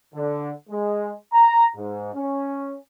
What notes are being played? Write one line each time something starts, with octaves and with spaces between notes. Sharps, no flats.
D3
G#3
A#5
G#2
C#4